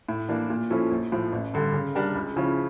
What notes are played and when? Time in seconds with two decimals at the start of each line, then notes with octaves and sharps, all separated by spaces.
0.09 A2
0.29 E3 A#3 D4
0.50 A#2
0.70 F3 C#4 E4 A4
0.92 A#1
1.12 A2 F3
1.32 A1
1.54 G2 D3 G3
1.73 C#3
1.95 G3 D4 G4 A#4
2.15 C#2
2.36 C#3 F3 C#4 E4